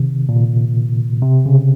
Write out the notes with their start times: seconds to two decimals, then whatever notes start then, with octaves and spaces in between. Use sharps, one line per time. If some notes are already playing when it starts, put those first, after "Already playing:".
Already playing: C3 D#3
0.29 A#2
1.22 C3
1.46 C#3